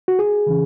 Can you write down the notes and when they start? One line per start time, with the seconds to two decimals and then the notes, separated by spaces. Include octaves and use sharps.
0.08 F#4
0.19 G#4
0.46 C#3 E3 C#4